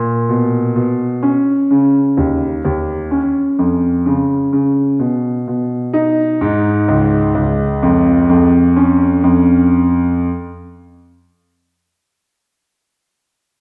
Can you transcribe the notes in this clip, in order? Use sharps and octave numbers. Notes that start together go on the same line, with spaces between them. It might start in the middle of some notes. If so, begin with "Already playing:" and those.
Already playing: A#2
B2
B2
C#4
C#3
D#2
D#2
C#4
F2
C#3
C#3
B2
B2
D#4
G#2
C#2
C#2
F2
F2
C#4
F2